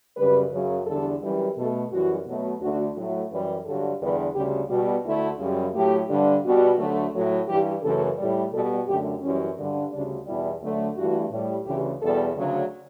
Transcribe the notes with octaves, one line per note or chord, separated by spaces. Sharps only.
F#2 C#3 G3 B4
F#2 C#3 F#3
E2 D3 G3 A4
F#2 E3 G3
B2 A3 A4
F#2 E3 G3 F#4
B2 F#3 A3
D2 D3 A3 F#4
A2 F#3 A3
F#2 E3 G3 B4
G2 D3 F#3 A4
E2 D3 G3 B4
D2 C#3 G3 G4
B2 G3 F#4
D2 D3 A3 E4
F#2 C#3 G3
A2 F#3 A3 G4
G2 D3 G3
B2 G3 F#4
D2 D3 F#3 A3
A2 F#3 A3
G2 E3 G3 G4
F#2 C#3 E3 A3 A4
A2 G3
B2 G3 A4
F#2 D3 A3 G4
F#2 E3 G3 C#4
G2 D3 G3
D2 C#3 G3 D4
E2 B2 G3 E4
D2 D3 F#3 A3
G2 E3 A3 F#4
A2 G3
D2 C#3 E3 G4
E2 B2 G3 A4
D2 C#3 F#3